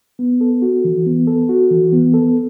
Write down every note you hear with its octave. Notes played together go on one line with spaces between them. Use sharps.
B3
A4
F#4
E3
B3
A4
F#4
E3
B3
A4